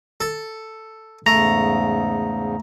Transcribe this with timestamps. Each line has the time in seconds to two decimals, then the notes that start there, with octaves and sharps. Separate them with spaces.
0.21 A4
1.26 E2 G#2 C#3 A3 A#5